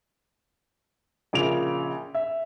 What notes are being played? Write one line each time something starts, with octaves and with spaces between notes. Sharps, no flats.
A#1 C#3 D7 F7
E5